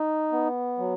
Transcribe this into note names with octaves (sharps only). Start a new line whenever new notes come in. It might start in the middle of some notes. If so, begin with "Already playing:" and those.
Already playing: D#4
B3
F#3